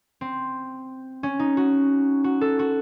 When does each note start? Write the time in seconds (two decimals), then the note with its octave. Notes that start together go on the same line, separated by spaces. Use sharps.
0.21 C4
1.23 C#4
1.39 D#4
1.57 F#4
2.24 F#4
2.41 A4
2.59 F#4